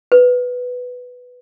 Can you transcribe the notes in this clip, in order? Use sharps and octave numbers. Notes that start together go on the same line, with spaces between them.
B4